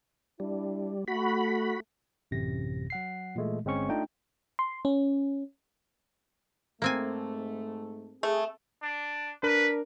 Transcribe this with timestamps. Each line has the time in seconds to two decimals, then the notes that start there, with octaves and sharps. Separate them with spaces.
0.40 G3 D4 E4
1.08 A3 F#4 B5
2.31 A1 F#2 C3 A#6
2.90 F#3 F#5 C7
3.35 A#2 E3 G#3 A3
3.65 G1 G#3 C4 C#4 C#6
3.89 A3 D4 D#4 F4 G5
4.59 C6
4.85 C#4
6.82 G#2 A3 A#3 C4 G#5
8.23 A3 G#4
8.83 D4
9.43 D4 A#4 B4